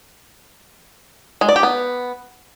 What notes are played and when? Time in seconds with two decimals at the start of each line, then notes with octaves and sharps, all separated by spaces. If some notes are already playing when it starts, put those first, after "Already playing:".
1.41 G#3
1.49 D5
1.56 G4
1.63 B3